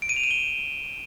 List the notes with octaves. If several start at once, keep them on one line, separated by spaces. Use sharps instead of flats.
D7
D#7
F7
E7
G7